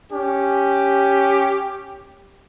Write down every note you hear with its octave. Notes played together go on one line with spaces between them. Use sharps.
C#4 G4